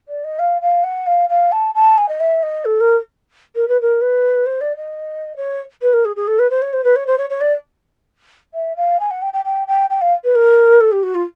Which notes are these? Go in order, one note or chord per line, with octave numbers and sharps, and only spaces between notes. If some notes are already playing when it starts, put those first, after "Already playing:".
D5
D#5
F5
F5
F#5
F5
F5
A5
A5
G#5
D#5
E5
D#5
A4
A#4
A#4
B4
A#4
B4
C5
D5
D#5
C#5
B4
A#4
G#4
G#4
A4
B4
C5
C#5
C5
B4
C#5
C5
C#5
C#5
D5
E5
F5
G#5
F#5
G5
G5
G5
G5
G5
F5
B4
A#4
A4
G4
F#4
F4